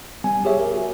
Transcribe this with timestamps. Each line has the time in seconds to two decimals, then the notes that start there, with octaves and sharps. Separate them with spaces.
0.24 G3 B3 G#5
0.45 G4 G#4 C#5 E5
0.60 A#4
0.74 F#4